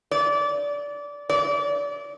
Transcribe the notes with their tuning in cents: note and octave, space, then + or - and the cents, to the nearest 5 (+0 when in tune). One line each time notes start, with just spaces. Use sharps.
D5 -20
D5 -35